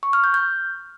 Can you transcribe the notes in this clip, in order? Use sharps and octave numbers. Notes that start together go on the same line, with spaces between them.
C#6
F6
G6
G6